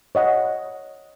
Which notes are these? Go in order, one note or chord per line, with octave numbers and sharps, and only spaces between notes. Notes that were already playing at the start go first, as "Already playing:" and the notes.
C#5 D#5 F#5